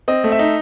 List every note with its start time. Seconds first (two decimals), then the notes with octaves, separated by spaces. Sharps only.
0.08 C4 D#5
0.24 A3
0.32 E5
0.39 D#4